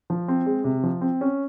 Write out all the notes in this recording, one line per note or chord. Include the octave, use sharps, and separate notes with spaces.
F3
C4
G#3
C3
F3
C4
C#4